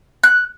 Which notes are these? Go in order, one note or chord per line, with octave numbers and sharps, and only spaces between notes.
F#6